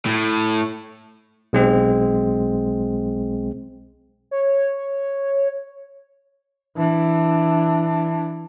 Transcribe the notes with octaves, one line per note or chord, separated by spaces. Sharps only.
A2
B1 G#3 C4
C#5
E3 D4